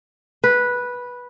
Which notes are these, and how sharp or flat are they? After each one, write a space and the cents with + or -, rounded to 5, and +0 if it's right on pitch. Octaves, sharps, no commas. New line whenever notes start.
B4 -10